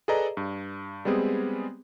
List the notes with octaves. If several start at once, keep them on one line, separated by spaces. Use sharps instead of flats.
G#4 A4 B4 D5 D#5 A#5
G2
G3 G#3 B3 C4 G#4